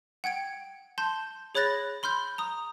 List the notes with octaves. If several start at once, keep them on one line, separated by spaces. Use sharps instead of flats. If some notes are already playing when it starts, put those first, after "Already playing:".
F#5 G5 G#6 D7
A5 C6 G6
G#4 C#5 B5 F#6 A6 A#6
B5 C6 F6 G6 G7
A#5 D#6